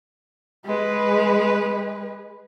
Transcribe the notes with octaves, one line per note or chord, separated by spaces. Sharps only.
G#3 B4